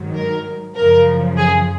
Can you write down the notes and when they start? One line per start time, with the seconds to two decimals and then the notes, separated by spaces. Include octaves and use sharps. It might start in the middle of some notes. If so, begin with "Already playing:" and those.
Already playing: G#2 D#3 F#3
0.14 A#4
0.75 F#2 C#3 F3 A#4
1.37 G#4